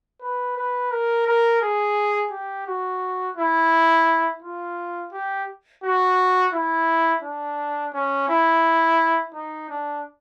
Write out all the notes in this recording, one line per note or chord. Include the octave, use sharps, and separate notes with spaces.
B4
B4
A#4
A#4
G#4
G4
F#4
E4
F4
G4
F#4
E4
D4
C#4
E4
D#4
D4